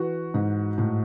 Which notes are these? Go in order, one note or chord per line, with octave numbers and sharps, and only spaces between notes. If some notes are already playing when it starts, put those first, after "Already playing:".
Already playing: E3 F#4
G#2
A2